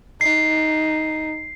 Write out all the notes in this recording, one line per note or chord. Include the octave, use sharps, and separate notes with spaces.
D#4 C7